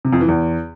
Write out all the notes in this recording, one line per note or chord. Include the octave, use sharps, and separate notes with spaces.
C3
F2
E3
E2